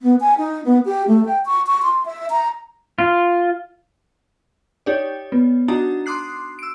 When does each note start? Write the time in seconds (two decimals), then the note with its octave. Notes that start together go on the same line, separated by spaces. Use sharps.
0.02 B3
0.20 G#5
0.38 D#4
0.64 B3
0.85 G4
1.08 A3
1.25 G5
1.46 C#6
1.67 C#6
1.83 C6
2.06 E5
2.30 A#5
2.99 F4
4.86 D#4 G4 C#5 D5
5.32 B3
5.68 D4 D#4 F#4 A5 A#5
6.06 C6 D6 D#6 F#6 C7
6.59 E6 D7